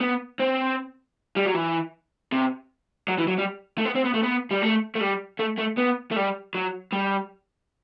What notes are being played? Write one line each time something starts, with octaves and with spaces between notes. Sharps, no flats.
B3
C4
G3
F#3
E3
C3
F#3
E3
F#3
G3
A3
B3
C4
B3
A3
B3
G3
A3
A3
G3
A3
A3
B3
A3
G3
F#3
G3